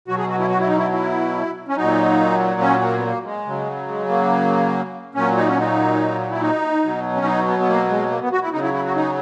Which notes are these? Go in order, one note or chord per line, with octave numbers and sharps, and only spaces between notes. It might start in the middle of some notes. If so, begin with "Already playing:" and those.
B2 F#3 F#4
G#4
F#4
E4
F#4
E4
D#4
E4
E4
C#4
A#2 F#3 D#4
C#4
A#3
B3
A#3
G#3
C#3 F#3
G#3
A#3
A#2 F#3 C#4
D#4
C#4
D#4
E4
D#4
B2 F#3
C#4
D#4
B3
B3
A#3
G#3
A#3
B3
F#4
E4
C#3 F#3 D#4
E4
E4
F#4
D#4